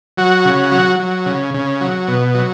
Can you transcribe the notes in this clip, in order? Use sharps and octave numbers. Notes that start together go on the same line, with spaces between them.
F#3 F#4
C#3
F#3
F#3
C#3
C#3
F#3
B2
F#3